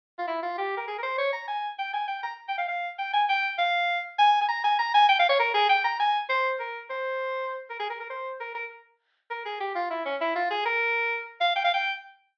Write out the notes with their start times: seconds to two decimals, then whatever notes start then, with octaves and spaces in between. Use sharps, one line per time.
0.19 F4
0.27 E4
0.43 F4
0.58 G4
0.77 A#4
0.88 G#4
0.98 A#4
1.03 C5
1.18 C#5
1.33 A#5
1.48 G#5
1.79 G5
1.93 G#5
2.08 G5
2.23 A#5
2.48 G5
2.58 F5
2.68 F5
2.98 G5
3.13 G#5
3.29 G5
3.58 F5
4.18 G#5
4.41 G#5
4.48 A#5
4.64 G#5
4.79 A#5
4.94 G#5
5.09 G5
5.19 F5
5.29 C#5
5.39 A#4
5.54 G#4
5.69 G5
5.84 A#5
6.00 G#5
6.30 C5
6.60 A#4
6.90 C5
7.70 A#4
7.80 G#4
7.90 A#4
8.00 A#4
8.10 C5
8.40 A#4
8.55 A#4
9.30 A#4
9.45 G#4
9.60 G4
9.75 F4
9.91 E4
10.05 C#4
10.21 E4
10.36 F4
10.51 G#4
10.65 A#4
11.40 F5
11.56 G5
11.65 F5
11.74 G5